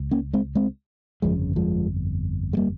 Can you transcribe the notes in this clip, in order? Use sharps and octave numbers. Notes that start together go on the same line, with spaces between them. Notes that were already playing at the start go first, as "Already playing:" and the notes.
Already playing: C#2
A#3 C#4
G#3 C4
G#3 C4
G1 F2 C#3 F3 G#3
F3 G#3
G#3
G3 A#3